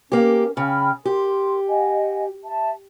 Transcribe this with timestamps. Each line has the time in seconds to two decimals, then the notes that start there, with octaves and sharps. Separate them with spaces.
0.12 A#3 C#4 G4 A#4
0.57 C#3 G5 B5 F6
1.05 G4 A#4 C6
1.68 D#5 F#5 G#5
2.45 E5 A5